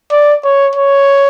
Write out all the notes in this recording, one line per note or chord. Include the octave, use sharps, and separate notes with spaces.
D5
C#5
C#5